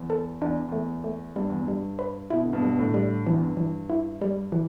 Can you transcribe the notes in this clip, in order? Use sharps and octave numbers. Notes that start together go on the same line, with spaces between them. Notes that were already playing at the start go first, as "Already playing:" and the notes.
Already playing: E2
A4
E2 D4
E2 A3
A3
G2 G3
E2
G2
G3
B4
B2 E4
D3
G2 B2
G3
A2 D3
G3
G2 E3
E2
G2
E3
E4
G3
E3